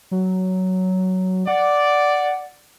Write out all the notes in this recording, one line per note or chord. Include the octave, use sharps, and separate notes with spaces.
F#3
D5 F#5